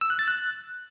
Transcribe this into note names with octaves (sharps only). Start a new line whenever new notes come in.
E6
F#6
A6
F#6